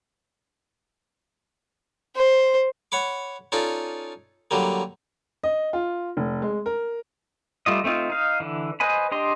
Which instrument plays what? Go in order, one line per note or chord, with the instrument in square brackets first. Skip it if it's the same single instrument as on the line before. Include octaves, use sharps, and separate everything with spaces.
[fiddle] C5
[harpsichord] C#5 F#5 B5 D6
C#4 D#4 F4 A4 D5
D3 F#3 G3 A#3
[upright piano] D#5
F4
F1
G#3
A#4
[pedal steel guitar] G3 A3 F4 D#5
A3 C4 D#4 F4
D#4 F5
D3 E3
B4 C5 D#5 G#5 B5
D4 G4 D#5 C6